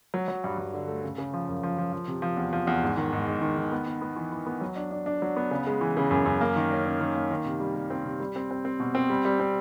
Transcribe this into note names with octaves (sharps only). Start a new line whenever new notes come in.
F#3
F#3
G2
G2
D3
A3
C#3
C#3
F3
F#2
F3
F3
F3
C3
F3
E2
F3
E2
G#2
D#3
G#2
G#2
D#3
D#3
B3
B3
B3
E3
E3
B3
F#3
D4
D4
D4
F#3
B3
C#3
G#3
E3
C#3
F#2
F#2
A#3
D#3
C#4
C#4
D#3
A#3
D#3
C3
G3
G3
C4
C3
G3
C4
C4
C4
B2
C4
G3
G3
C4